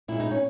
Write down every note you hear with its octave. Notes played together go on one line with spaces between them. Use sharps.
A#2 G#3 E4
D#4
C#4